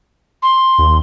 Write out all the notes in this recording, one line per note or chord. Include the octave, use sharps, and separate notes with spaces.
C6
D#2